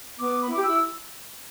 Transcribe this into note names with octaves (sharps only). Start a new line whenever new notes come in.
B3 D6
B5
E4
G4 D6
E4 E6